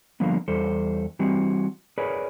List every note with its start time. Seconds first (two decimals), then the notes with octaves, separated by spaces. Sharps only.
0.20 D3 F3 G3 A#3 B3
0.48 E2 G3 A4 C5
1.19 E3 G3 C4 F#4
1.98 G#4 A#4 B4 C#5 D5